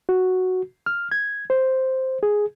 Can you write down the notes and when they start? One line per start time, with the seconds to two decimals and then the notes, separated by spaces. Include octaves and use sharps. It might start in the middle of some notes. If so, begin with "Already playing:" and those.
0.09 F#4
0.86 F6
1.12 G#6
1.50 C5
2.23 G#4